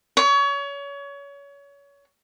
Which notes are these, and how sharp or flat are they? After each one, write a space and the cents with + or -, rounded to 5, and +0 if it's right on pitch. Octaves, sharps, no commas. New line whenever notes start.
C#5 +30